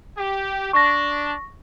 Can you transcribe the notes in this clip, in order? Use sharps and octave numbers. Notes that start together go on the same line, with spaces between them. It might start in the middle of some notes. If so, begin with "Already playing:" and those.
G4
D4 C#6 A#6